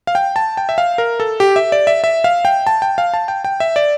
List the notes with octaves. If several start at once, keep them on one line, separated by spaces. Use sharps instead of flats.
F5
G5
A5
G5
E5
F5
A#4
A4
G4
E5
D5
E5
E5
F5
G5
A5
G5
F5
A5
G5
G5
E5
D5